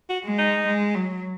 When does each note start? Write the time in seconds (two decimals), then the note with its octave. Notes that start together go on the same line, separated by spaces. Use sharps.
0.10 F#4
0.24 G#3
0.38 D#4
0.67 G#3
0.95 F#3